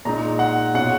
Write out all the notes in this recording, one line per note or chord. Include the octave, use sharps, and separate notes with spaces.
A#2 G#3 D#4 A#5
F#5
B2 G#3 C#4 F4 F#5